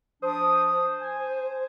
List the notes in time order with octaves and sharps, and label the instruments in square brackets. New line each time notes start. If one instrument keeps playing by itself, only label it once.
[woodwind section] F3 D4 D#6 [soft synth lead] C5
[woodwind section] G#5